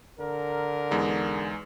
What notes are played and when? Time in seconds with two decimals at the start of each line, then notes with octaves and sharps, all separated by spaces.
0.19 D3 A#4
0.91 E2 G#3 D#4